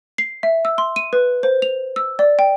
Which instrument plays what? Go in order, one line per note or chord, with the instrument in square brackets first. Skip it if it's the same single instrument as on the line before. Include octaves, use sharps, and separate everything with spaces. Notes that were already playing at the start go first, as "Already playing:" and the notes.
[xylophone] C7
E5
E6
C6
D#7
B4
C5
F7
E6
D5
G5